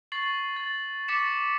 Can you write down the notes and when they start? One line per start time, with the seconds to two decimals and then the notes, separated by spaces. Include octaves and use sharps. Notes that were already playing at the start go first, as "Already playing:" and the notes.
0.12 C#6 A6 C7 F#7
0.56 A6
1.08 C#6 D6 A6 B6 C#7 E7